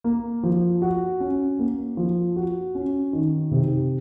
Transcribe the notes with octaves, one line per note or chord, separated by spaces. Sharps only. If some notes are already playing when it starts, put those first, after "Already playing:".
A#3
F3
F#4
C#4
A#3
F3
F#4
C#4
D#3
C3